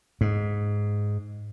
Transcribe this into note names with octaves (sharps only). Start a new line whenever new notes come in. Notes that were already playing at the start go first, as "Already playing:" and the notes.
G#2